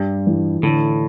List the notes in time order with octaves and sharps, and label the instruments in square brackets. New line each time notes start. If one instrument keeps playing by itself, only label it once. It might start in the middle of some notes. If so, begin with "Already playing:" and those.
Already playing: [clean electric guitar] G2 [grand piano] G3
[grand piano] E3
[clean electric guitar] A2 [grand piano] D3